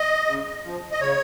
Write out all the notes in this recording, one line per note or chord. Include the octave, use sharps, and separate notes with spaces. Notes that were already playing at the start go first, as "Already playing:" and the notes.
Already playing: D#5
C#3
F3
D#5
C#3 C#5